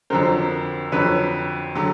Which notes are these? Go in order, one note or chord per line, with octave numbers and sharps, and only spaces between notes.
F2 D3 F#3 A#4 C5
F2 D3 F#3 B4 C#5
D3 F#3